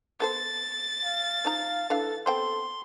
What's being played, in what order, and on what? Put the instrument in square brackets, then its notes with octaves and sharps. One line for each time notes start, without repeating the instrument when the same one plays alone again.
[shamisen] B3 A4 C5 [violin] A6
[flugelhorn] F5
[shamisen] F3 D#4 A#5
[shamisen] E3 D4 F5 [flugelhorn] A4
[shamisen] B3 C4 G5 [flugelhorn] A4 [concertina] C6